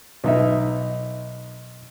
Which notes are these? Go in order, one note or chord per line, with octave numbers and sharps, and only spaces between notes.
B1 D#4 E5